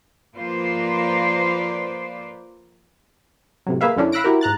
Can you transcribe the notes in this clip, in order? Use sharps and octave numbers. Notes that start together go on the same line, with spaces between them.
F3 A#3 F4 B4 C5 D5
A2 C3 F#3
A#3 G#4 B4 E5 F5
F#2 D3 C#4 D4 E4
F5 B5 E6 F#6 A#6 D7
E4 F#4 G4 A#4
G#2 A#5 F#6 A6